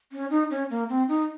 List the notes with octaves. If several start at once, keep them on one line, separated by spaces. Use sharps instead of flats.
C#4
D#4
C#4
A#3
C4
D#4